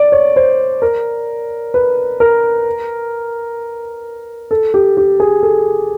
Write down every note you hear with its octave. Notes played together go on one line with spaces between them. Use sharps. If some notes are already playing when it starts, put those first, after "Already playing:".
Already playing: D5
C#5
C5
A#4
B4
A#4
A4
G4
G4
G#4
A4